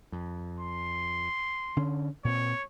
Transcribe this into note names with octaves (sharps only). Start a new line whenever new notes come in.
F2
C6
D3 C#4
A#2 C4 C#5